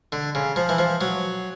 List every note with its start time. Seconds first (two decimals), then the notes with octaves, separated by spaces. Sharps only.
0.12 D3
0.35 C#3
0.56 F3
0.69 E3
0.79 F3
1.01 F#3